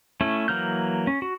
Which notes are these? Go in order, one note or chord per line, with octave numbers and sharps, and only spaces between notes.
A3 C#4 E4
E3 F#3 A#3 F6 G6
C#4
F#4